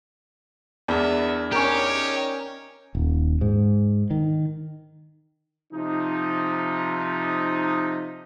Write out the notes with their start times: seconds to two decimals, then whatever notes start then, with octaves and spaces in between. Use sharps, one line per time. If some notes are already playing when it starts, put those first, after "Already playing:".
0.88 E2 B3 D4 A#4 E5
1.52 C#4 D#4 G4 A#4 C#5
2.95 D#1
3.41 G#2
4.11 D#3
5.73 C3 F3 D#4